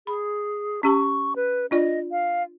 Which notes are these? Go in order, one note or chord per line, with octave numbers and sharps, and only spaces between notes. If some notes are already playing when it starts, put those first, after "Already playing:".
G#4 B5
C#4 G4 A5 C#6
B4
D4 F4 D5 D#5
F5